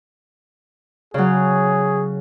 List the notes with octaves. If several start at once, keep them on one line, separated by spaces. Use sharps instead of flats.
C#3 F#3 G#4